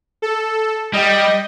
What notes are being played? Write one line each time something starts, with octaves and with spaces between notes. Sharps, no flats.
A4
G3 D#5 G5